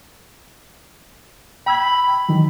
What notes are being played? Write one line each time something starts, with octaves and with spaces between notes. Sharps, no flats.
G5 B5 E6 G#6
D#3 E3 F#3